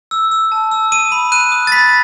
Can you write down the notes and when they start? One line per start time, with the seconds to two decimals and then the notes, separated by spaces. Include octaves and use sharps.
0.11 E6
0.32 E6
0.52 A5
0.71 E6
0.92 D#6 D#7
1.12 B5
1.32 F#6 D#7
1.52 D#6
1.67 A6
1.72 B5 B6